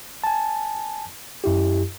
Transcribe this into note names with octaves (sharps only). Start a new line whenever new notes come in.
G#5 A5
F#2 E4 G4